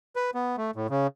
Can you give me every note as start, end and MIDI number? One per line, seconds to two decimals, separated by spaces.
0.16 0.31 71
0.35 0.56 59
0.57 0.71 57
0.76 0.87 45
0.90 1.07 49